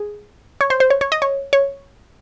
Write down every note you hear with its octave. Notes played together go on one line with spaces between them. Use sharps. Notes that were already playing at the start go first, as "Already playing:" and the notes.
Already playing: G#4
C#5
C5
C5
C#5
C#5
D#5
C#5
C#5